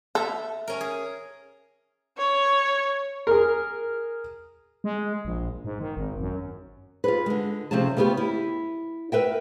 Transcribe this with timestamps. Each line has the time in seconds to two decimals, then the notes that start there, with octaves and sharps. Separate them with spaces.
0.15 A4 E5 A#5
0.68 C#4 A#4
0.81 G#4
2.17 C#5
3.27 G#4 A#4
4.84 G#3
5.25 A#1
5.65 G#2
5.81 D#3
5.97 G#1
6.20 F#2
7.04 F4 G#4 B4
7.26 D3 G#3
7.71 C3 F3 A3 C#4 G#4 A5
7.97 C#3 A3 B3 F4 G4
8.17 E4
9.12 A#4 B4 E5 G5